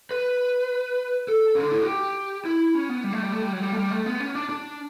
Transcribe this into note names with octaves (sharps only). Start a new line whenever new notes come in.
B4
A4
C#4
D4
E4
F#4
G4
E4
C#4
B3
G3
A3
G3
A3
G3
F#3
G3
A3
G3
A3
B3
C#4
D4
D4